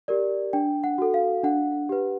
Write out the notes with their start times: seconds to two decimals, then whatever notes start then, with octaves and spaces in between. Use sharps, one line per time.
0.08 G4 A#4 D5
0.53 D4 G5
0.84 F#5
0.98 F#4 A4
1.14 F5
1.44 D4 F#5
1.89 G4 B4